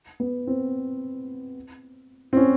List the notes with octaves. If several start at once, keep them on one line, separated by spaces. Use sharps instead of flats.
B3
C4
C4
C#4